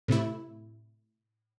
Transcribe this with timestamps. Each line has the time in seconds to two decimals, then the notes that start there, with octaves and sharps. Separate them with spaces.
0.08 A2 C3 A3 E4